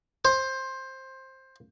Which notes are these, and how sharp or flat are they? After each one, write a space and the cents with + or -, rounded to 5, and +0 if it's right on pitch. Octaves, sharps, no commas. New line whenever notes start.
C5 +15